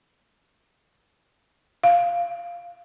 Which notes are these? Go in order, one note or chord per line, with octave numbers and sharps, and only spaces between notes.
F5